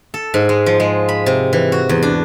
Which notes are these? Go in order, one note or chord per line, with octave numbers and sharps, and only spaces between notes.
A4
G#2
G#3
F3
G#3
B5
C3
E3
F#4
E2
D4